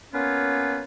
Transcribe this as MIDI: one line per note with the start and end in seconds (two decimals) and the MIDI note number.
0.13 0.83 58
0.13 0.83 59
0.13 0.83 61
0.13 0.83 65
0.13 0.83 71
0.13 0.83 73